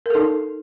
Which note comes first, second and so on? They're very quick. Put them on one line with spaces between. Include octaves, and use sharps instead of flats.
A#4 A4 D#4